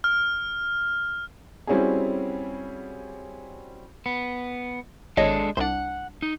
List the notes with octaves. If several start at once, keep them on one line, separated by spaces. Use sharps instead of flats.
F6
G3 C4 C#4 E4 F#4 G#4
B3
G#1 G#3 D4 A4 C#5 D#5
C2 D4 C5 F#5
D#4